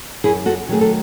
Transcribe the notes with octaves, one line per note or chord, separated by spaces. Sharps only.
F#2 E4 G#4
F#4 A4
D#3 F#3 A3 G#4
A4